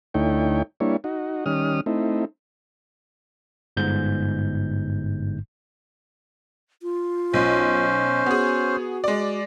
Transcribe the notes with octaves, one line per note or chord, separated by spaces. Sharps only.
D2 A3 D#4 E4 C#5 G5
G3 A#3 D4 E4 C#5
D#4 F#4
D#3 G3 C#4 D#6 F6
A3 C4 D#4 E4
G1 G#2 G6
F4
B1 C#4 C5
B3 F#4 G#4
G#3 D5